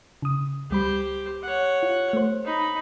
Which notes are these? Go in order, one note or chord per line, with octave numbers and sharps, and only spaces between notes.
C#3 D#6
C#2 G3 G4 C5 B5
C#5 F#5
F4
A3 C5
D#4 B5